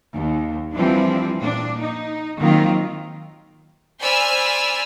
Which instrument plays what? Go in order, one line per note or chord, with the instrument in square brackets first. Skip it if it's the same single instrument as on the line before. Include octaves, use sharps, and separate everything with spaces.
[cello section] D#2
E3 F3 G3 C4 D4 E4
A#2 D4
D#4
D#3 F#3 A#3 C4 F4
[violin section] C5 D5 G#5 B5 E6 F6